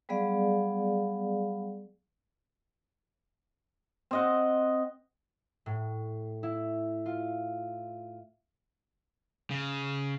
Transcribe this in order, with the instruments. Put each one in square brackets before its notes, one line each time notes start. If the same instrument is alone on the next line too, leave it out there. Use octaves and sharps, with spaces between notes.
[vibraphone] F#3 G3 B3 G#4 D5 F5
[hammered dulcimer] C4 D#5 F#5
[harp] A2
E4
F4
[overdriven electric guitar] C#3